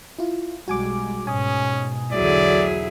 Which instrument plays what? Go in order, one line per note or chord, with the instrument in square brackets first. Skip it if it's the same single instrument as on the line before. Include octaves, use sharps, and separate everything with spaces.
[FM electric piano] E4 F4
[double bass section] B1 G3 G#3 [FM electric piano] F#4 G#5 D6
[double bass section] G#2 B2 [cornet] C#4 [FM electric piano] G#5 D#6
[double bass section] B1 E2 D3 [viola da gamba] F#3 E4 G#4 [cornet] D5